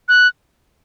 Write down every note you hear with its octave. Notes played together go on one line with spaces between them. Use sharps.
F#6